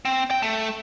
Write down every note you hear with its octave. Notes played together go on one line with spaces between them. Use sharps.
C4
G5
A3